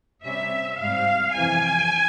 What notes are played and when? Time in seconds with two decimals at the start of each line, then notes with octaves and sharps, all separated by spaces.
0.24 C3 G3 C#4 E5
0.79 G#2 G3 C4 F5
1.34 F2 C3 E3 G#5